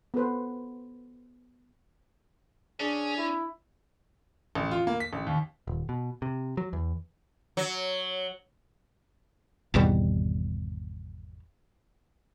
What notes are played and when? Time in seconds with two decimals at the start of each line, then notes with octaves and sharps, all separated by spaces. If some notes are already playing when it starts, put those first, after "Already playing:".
0.14 B3 A4 B4 C5
2.80 C#4 D4 G#4
3.17 E4
4.55 A1
4.71 F4
4.87 A#3
5.00 B6
5.13 A1
5.27 D#2
5.67 D#1
5.89 B2
6.22 C3
6.57 F#3
6.73 E2
7.57 F#3
9.74 G#1 E2 B2 G3